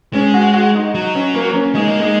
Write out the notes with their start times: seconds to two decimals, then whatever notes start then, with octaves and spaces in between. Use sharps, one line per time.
0.13 G#3 C#4
0.34 F#4
0.54 F#4
0.74 D#4
0.94 F#3 D#4
1.15 C#4
1.34 A#3
1.54 C#4
1.75 G#3 D#4
1.87 A#3
2.00 G#3 D#4